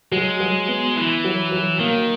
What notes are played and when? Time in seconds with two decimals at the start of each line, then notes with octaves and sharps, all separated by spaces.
0.12 F#3 G#3
0.40 F#3
0.68 B3
0.96 E3 E4
1.24 F#3
1.52 F#3
1.79 D#3 A#3